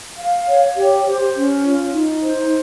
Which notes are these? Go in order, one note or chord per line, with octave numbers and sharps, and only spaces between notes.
F5
C#5
G4
C5
C#4
F4
D#4
C5